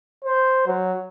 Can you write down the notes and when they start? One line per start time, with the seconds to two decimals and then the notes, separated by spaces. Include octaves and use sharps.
0.24 C5
0.67 F#3